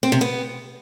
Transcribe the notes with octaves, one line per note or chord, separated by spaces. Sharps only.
C4
C3
B3